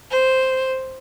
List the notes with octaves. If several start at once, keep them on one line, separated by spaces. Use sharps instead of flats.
C5